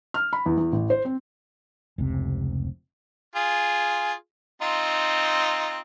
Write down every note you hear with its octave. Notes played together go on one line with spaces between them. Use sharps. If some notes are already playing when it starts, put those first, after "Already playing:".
F6
B5
E2
E2
A1
C5
C4
F1 C#2 C3
F4 G#4
C4 D#4 F4